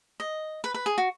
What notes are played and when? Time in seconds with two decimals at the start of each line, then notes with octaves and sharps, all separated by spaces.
0.20 D#5
0.64 B4
0.74 B4
0.86 G#4
0.98 F#4